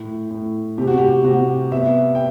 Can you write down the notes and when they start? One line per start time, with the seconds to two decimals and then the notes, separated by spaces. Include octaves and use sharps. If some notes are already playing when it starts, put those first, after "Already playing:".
Already playing: A2
0.30 A2
0.78 C3 G4
0.87 F#4
0.98 G4
1.24 C3 F#4
1.71 B3 E5
2.15 G5